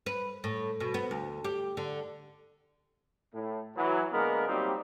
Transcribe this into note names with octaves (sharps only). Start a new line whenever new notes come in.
B4
A2
B2
B3
D2
G4
D3
A2
E3 F#3
D3 G#3 A#3 B3 A#4
F#3 G3 A#3 C4 D#4 G4